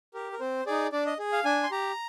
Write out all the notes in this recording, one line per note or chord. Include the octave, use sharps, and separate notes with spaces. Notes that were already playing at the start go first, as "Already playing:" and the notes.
G4 A#4
A#4
C4 C5
D#4 G#4 D5
D4 D5
D#5
G#4
F5
D4 G#5
C6
G4 A#5